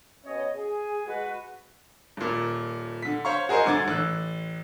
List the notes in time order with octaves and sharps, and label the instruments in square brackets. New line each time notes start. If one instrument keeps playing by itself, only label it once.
[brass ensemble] B2 C#4 C#5 D#5
G#4
G#3 F#4 B4
[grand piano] D#1 A#2
D3 B6
C5 C#5 F5 C#6
F#4 G#4 A#4 C5 D#5
C2 D3 D6 G#6 A6
A1 E6 F#6